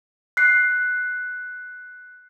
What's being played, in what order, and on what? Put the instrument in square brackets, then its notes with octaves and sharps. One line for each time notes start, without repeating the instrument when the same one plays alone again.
[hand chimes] F#6 C7